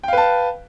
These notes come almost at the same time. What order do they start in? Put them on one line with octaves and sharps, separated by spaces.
G5 F5 B4 A5